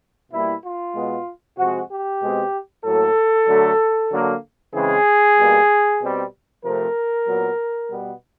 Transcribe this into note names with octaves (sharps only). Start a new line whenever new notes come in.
B2 G3 A#3 E4
F4
B2 G#3 B3
C3 F3 G#3 C4 F#4
G4
B2 G#3 C4
A2 F#3 A#3 A4
D3 F#3 A3
D3 F#3 A#3
C#3 E3 G#3 C4 G#4
B2 G3 A#3
B2 G3 C4
C3 F3 A3 C4 A#4
A#2 F#3 B3
B2 G3 B3